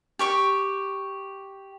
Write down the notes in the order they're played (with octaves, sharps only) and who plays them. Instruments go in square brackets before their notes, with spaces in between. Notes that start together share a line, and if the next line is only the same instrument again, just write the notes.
[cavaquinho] G4 C#6 D6